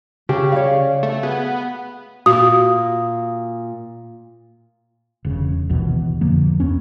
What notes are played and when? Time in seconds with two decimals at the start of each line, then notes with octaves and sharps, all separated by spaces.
0.29 C#3 G4
0.52 C#5 D5 F5
1.03 A3
1.23 B3 G#4
2.26 A#2 F#4 D#6
5.25 E1 C#3
5.69 G#1 D#2 B2 E3
6.21 F2 D3 F3 A#3
6.60 E2 B3 C#4